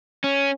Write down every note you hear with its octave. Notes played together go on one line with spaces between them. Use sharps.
C#4